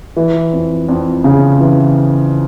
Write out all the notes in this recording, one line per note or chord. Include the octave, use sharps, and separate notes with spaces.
E3
F2
F2
C#3
E3